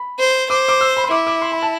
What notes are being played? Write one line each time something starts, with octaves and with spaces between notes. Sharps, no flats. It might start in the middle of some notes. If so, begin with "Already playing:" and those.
Already playing: B5
C5
C5 D6
D6
E6
B5
C6
E4 D6
D6
C6
B5
A5